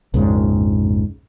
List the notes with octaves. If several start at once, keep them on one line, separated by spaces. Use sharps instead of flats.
A#1 F2 G#2 C#3